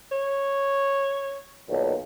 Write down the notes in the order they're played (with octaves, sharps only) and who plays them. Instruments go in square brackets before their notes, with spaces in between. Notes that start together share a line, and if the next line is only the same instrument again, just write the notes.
[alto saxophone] C#5
[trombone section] B1 A#2 D#3